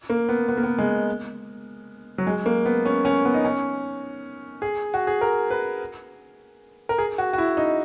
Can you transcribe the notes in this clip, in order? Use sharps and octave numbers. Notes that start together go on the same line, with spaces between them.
A#3
B3
B3
A#3
B3
G#3
F#3
G#3
A#3
B3
C#4
C#4
B3
D#4
C#4
G#4
F#4
G#4
A#4
B4
A#4
G#4
F#4
F#4
E4
D#4